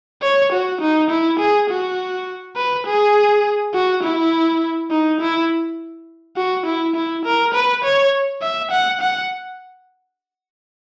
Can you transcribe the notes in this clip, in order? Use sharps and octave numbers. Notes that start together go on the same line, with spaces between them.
C#5
F#4
D#4
E4
G#4
F#4
B4
G#4
F#4
E4
D#4
E4
F#4
E4
E4
A#4
B4
C#5
E5
F#5
F#5